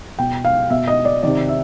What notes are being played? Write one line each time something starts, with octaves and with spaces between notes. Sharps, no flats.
B2 G5
F5
B2 E5
D#5
D5
C3 D#3 D5
E5